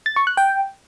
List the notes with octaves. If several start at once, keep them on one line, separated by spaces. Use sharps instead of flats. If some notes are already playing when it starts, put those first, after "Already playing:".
A6
C#6
F#6
G5